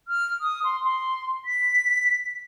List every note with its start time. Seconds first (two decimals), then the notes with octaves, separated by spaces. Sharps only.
0.08 F6
0.41 D#6
0.64 C6
0.83 C6
1.45 B6